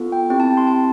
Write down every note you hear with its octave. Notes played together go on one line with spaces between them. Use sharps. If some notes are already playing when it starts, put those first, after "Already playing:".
Already playing: B3 F4 A4
G5
C4 E4 G4 G5
A5
C6
A5